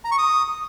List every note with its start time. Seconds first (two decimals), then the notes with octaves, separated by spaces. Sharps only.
0.05 A#5
0.11 C#6
0.18 D#6